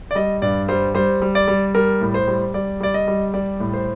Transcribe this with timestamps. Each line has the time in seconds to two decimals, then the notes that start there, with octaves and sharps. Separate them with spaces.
0.11 D5
0.15 G3 D#5
0.42 G2 D5
0.68 G3 C5
0.94 G3 C5
1.22 G3
1.35 D5
1.48 G3
1.75 G3 A#4
2.01 A2
2.14 C5
2.28 G3
2.54 G3 D5
2.81 G3 D5
2.94 D#5
3.08 G3
3.34 G3 D5
3.60 A2
3.73 C5